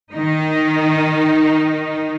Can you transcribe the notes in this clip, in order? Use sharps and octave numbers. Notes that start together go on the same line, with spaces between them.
D#3 D#4